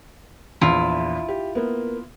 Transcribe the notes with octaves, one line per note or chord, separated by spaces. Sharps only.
A#1 E2 E4 F4
G4
A#3 B3